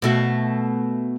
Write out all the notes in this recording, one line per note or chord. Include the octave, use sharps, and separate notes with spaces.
B2 A3 F#4